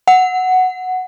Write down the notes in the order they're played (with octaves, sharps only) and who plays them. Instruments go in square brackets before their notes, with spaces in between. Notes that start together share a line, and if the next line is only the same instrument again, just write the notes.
[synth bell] F#5